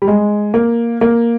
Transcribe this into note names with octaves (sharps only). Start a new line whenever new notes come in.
G3
G#3
A#3
A#3